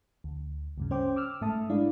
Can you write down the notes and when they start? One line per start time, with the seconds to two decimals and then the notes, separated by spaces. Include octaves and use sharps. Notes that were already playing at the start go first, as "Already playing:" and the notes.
0.24 D2
0.78 D2 G2 C#3
0.91 C#4 C5 G5 D6
1.16 D6 E6 F6
1.41 G#2 A3 E5 A5 D#6
1.69 G#3 D4 E4 D5 F5